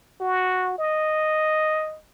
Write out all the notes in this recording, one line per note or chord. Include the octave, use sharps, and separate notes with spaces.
F#4
D#5